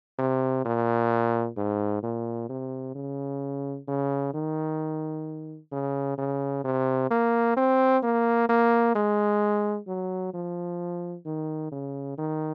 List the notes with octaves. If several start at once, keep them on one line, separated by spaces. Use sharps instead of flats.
C3
A#2
G#2
A#2
C3
C#3
C#3
D#3
C#3
C#3
C3
A#3
C4
A#3
A#3
G#3
F#3
F3
D#3
C#3
D#3